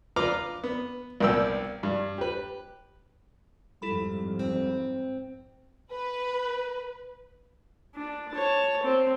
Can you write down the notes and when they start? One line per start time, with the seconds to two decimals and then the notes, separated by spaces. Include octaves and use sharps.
0.16 F4 B4 A#5 D6 F6
0.64 B3
1.20 C2 A#2 B3 A#4 G5 E6
1.83 G2
2.18 G4 B4
3.82 F2 G#2 G3 E4 A4 B5
4.39 C4
5.91 B4
7.95 D4
8.32 C#5 A5
8.83 C4